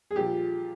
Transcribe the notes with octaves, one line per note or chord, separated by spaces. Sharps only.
G#4
A#2 F3 G4